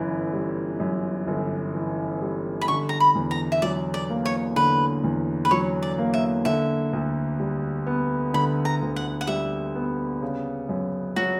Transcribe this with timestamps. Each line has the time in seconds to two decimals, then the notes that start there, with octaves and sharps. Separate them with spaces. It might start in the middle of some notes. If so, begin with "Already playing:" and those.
Already playing: G1 F#2 E3
0.33 G3
0.80 F#2
1.27 G1
1.74 E3
2.22 G3
2.61 B5
2.68 D3 C#6
2.89 A#5
3.00 B5
3.15 E2
3.31 A#5
3.52 E5
3.62 F#3 D5
3.94 D5
4.10 A#3
4.25 C#5
4.56 D3 B4
5.04 E2
5.45 B4
5.51 F#3 C#5
5.83 D5
5.98 A#3
6.14 E5
6.45 D3 E5
6.93 D2
7.40 G3
7.87 B3
8.34 D3 B5
8.65 A#5
8.81 D2
8.96 F#5
9.21 F#5
9.27 G3 E5
9.75 B3
10.21 C#3
10.69 F#2
11.16 F#3 F#4